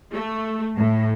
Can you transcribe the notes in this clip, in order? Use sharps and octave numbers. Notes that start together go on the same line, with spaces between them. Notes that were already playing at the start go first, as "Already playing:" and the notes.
A3
A2